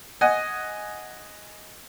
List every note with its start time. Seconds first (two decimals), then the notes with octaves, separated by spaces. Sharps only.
0.21 D#5 F#5 G#5